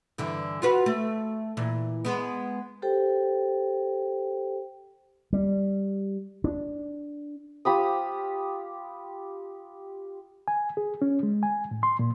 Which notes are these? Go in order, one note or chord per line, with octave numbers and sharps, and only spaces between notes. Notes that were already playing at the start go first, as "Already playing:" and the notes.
G2 D3 E3
F4 F#4 B4
A3
A#2 E3
G#3 B3
G4 A4 C5 G5
G3
D4
F4 G4 B5 D#6
G#5
G#4
C#4
G#3
G#5
A2
C6
A#2